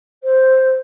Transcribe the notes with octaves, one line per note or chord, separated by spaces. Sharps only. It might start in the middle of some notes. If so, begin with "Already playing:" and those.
C5